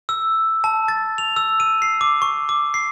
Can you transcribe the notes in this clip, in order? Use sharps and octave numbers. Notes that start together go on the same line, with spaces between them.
E6
A5
A6
F7
E6
D#7
C7
D6
C#6
D6
C7